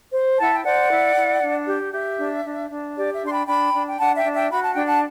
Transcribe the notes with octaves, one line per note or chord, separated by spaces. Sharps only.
C5
E4 F#5 A5
G5
C5 D5 F#5
E4
E4
D4
G4
G4 E5
D4
D4
D4
G4 D5
E5
D4 C6
G5 B5
D4 G5 B5
D4
G5
D4 F#5 A5
E5 G5
D4
E5 G5
F#4 B5
A5
D4 G5
F#5 A5